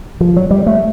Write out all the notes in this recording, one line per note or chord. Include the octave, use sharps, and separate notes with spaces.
F3
F#3
G3
A3